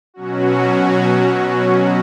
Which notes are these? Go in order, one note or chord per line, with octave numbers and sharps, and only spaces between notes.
B2 F#3 C#4 F#4